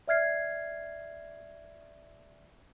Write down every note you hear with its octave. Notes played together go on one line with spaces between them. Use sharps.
D5 E5 F6 G#6 C7